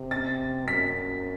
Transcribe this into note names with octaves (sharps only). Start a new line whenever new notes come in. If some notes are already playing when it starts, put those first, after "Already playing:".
Already playing: C3
A6
F#2 B6